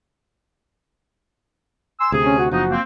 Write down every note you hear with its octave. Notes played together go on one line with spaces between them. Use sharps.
G#5 C6 E6
D2 C3 G#4
C#4
F#4
F#1 F3 B3 D4 D#4 F#4
A#3 C4